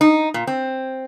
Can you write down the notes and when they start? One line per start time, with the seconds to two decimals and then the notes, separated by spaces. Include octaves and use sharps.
0.01 D#4
0.34 A#2
0.47 C4